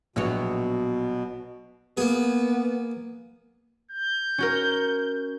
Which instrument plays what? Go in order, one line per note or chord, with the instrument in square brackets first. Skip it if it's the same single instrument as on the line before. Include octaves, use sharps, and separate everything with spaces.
[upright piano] A#1 [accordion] B2 [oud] F#3 B3 C#5
[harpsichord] A#3 G#4 [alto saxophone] B3
[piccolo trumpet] G6
[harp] C#4 F#4 A#4